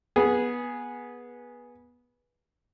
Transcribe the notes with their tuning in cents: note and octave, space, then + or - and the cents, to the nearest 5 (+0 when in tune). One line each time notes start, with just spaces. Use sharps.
B3 -20 G#4 +0